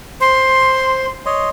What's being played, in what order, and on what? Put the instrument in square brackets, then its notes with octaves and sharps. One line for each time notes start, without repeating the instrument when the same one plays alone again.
[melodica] C5 [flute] C6
[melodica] C#5 D#5 C6